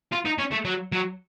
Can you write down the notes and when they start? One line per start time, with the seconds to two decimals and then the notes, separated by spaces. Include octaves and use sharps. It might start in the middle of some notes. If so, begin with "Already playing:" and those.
0.12 F4
0.26 D#4
0.39 C#4
0.52 A3
0.65 F#3
0.92 F#3